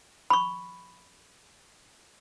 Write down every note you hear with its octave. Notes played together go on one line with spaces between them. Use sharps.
B5 C#6